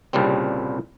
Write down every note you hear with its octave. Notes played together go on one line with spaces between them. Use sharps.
C2 A#2 C#3 G3 C4